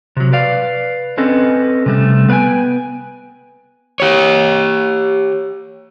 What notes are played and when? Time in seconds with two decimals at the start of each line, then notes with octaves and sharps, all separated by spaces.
0.17 C3 F#3
0.33 B4 D5 F5
1.18 C4 C#4 A4 B4 D#5
1.86 C3 G3 A3
2.28 B3 B4 F5 G5 G#5
4.00 G4 C#5